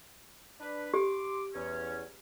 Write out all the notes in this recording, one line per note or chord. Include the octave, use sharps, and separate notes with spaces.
D4 B4
G4 C6 D6
E2 C#4